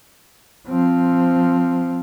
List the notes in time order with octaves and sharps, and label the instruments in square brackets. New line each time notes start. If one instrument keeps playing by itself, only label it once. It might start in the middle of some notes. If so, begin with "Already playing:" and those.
[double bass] F3 C4